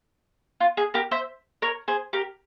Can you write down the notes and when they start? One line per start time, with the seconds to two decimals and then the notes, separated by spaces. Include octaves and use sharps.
0.60 F4
0.77 G#4
0.94 G4 A#4
1.11 C5 E5
1.62 A#4 C#5
1.88 G#4 C5
2.13 G4 A#4